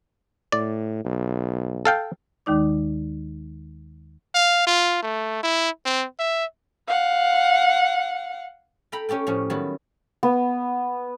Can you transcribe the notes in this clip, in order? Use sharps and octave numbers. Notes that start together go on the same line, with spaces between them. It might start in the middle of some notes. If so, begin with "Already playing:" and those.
A2 D5
B1
A4 F5 G5
D#2 D#3 G#3 D#4 D5 D6
F5
F4
A3
E4
C4
E5
F5 F#5
A4 G5 A#5 B5
C#4 G4 A4 G5
A2 F3 C#4
D#3 F#3 G3 B3 E4
B3